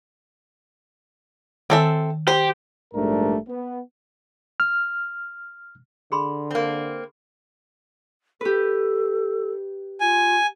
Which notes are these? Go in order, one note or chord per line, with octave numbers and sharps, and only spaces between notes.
D#3 C4 A4 E5 G#5
G4 C5
A#1 G#2 G3 A3 D4 A#4
B3
F6
D3 G#4 B5 C6
A#3 C4
G4 A4 B4
F4 G#5